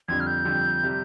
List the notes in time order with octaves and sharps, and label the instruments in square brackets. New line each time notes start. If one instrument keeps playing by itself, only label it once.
[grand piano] F2 D3 G3 [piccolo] G#6
[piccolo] F6
G6
[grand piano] F2 D3 G3
C3 G3